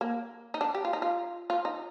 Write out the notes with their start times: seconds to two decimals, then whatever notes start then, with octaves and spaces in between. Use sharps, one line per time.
0.01 A#3
0.54 D#4
0.61 D4
0.74 G4
0.85 F4
0.93 D#4
1.02 F4
1.50 F4
1.65 D#4